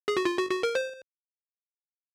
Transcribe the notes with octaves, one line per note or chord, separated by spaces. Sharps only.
G#4
F#4
F4
F#4
F#4
A#4
C5